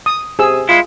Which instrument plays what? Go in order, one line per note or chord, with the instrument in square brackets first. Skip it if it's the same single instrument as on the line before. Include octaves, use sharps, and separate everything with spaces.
[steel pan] D#6
[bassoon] C3 [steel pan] G#4 E6
[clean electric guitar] G#3 E4 [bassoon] F4